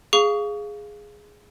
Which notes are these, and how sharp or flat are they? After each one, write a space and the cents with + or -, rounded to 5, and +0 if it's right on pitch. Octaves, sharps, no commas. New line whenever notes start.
G#4 +0 F5 +0 C#6 +30